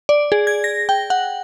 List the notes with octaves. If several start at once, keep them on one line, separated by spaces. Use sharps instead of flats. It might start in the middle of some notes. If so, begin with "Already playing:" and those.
D5
G#4
G#6
A#6
G5
F#5